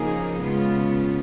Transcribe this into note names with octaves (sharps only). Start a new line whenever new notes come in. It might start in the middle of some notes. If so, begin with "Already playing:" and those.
Already playing: C#3 F3 A#3 D#4 G#4
C#3 G#3 B3 F4